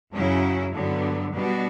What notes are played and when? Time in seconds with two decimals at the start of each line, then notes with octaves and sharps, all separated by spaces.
0.14 F#2 C#3 F#3 C#4 E4
0.75 G2 D3 F#3 B3
1.35 B2 G3 B3 D4 F#4